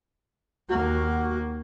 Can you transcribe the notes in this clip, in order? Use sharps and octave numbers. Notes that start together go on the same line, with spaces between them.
D#2 A#3 F#4